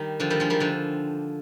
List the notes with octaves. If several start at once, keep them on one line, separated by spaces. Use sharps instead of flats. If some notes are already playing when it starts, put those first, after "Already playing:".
Already playing: D#3 G3
D3 F3
D#3 G3
F3 G#3
D#3 G3
D3 F3